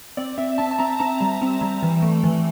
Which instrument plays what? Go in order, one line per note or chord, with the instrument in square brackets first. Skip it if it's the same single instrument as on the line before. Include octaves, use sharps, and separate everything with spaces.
[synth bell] C4 D5
C4 E5
C4 A5
A5
C4 A#5
C4 A#5
G3
C4
G3
E3
A3
E3